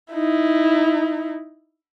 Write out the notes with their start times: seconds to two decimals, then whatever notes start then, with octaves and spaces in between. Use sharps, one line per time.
0.14 D#4 E4